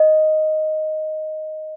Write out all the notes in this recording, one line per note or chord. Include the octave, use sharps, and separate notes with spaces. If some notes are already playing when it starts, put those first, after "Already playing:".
Already playing: D#5